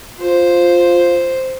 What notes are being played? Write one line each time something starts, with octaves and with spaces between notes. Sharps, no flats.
F4 C5